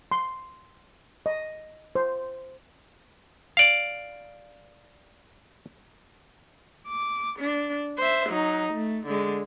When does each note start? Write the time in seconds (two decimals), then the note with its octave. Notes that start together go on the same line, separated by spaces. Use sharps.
0.12 C6
1.26 D#5
1.95 C5
3.57 D5 F5
6.88 D6
7.39 D4
7.98 C5 E5
8.29 F#3 D#4
8.73 A3
9.07 D3 G#3